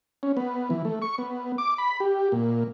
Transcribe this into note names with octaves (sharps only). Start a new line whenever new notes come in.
C#4
B3
E3
A3
C#6
B3
D6
B5
G4
A#2